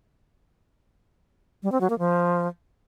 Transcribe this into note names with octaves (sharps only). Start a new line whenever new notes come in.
G3
C4
F#3
A#3
F3